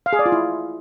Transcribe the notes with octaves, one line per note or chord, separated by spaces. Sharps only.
F5
G#4
D5
F4
E4